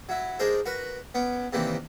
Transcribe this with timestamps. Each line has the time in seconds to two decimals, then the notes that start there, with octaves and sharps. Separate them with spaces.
0.09 F#3 E4
0.39 G#3 D4 D#4 G#4 A#4 C5
0.66 F#4 A#4 B4
1.14 B3 C#4 D6
1.53 C3 D#3 E3 G3 A#3 C4